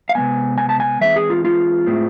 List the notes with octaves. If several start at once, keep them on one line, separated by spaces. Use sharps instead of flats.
F5
C3 G#3 B3 G#5
G#5
A5
G#5
E3 G#3 C4 E5
G#4
F4
F4
A2 G#3 C4